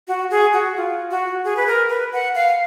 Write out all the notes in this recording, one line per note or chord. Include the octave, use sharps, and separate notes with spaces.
F#4
G#4
F#4
F4
F#4
G#4
B4
A#4
B4
F#5
F5